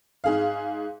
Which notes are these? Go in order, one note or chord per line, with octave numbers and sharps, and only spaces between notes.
G#2 G#4 F5